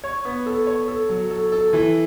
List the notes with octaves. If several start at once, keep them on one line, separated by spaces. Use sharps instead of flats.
C#5
B3
A4
C#5
A4
F#3
A4
A4
E3